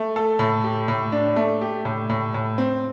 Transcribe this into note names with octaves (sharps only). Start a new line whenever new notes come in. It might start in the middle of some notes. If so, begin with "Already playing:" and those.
Already playing: A3
A4
A2
G4
A2
D4
A3
G4
A2
A2
A2
C4